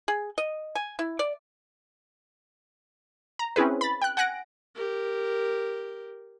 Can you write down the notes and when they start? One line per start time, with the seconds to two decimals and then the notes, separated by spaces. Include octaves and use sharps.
0.08 G#4
0.38 D#5
0.75 G#5
0.99 E4
1.19 D5
3.39 A#5
3.56 C4 C#4 E4 G#4 B4
3.81 B5 A6
4.02 G5 F#6
4.17 F#5 G#5 F#6 A#6 D7
4.75 G4 A#4